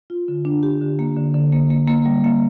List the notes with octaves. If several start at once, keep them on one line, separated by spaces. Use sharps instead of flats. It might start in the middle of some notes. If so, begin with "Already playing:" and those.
F4
D3
D4
G4
D3
A#3
D3
D3
A#3
A#3
A#3
G3
A#3